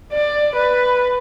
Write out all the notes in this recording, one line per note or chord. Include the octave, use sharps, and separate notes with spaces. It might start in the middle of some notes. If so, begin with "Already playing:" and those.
D5
B4